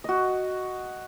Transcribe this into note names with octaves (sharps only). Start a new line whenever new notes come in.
F#4 D#5